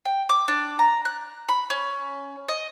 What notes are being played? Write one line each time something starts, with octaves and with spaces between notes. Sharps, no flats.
G5
D6
D4
A#5
F#6
B5
C#4
D#5